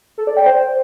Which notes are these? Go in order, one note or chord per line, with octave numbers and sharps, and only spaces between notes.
A4
D5
G5
C5